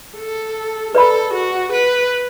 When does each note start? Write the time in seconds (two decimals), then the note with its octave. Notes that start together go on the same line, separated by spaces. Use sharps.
0.17 A4
0.95 A4 B4 D5 B5
1.33 F#4
1.72 B4